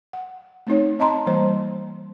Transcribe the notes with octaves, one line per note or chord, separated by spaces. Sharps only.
F#5
A3 C4 D#4 C#5
C4 D#5 A5 A#5 C6
E3 G3 A#3 C5